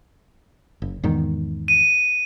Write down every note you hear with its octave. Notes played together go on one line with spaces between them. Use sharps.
F#1
E2 G#2 D#3
D#7